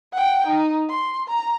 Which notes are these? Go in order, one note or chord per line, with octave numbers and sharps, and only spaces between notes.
F#5 G5
D#4
C6
A#5